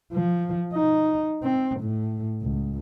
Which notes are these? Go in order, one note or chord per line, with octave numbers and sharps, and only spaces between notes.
F3
D#4
C4
A2
C#2